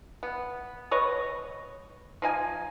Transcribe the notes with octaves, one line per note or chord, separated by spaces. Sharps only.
B3
B4 C#5 D#5
F3 D#4 G#5